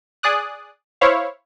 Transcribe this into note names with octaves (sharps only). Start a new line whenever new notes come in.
G#4 D5 D#6 F#6
E4 C5 C#5 F5